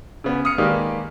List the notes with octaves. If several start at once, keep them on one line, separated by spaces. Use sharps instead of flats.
C#3 B3
D#6 F6 C#7
D#3 G#3 A#3 G4 B4 D5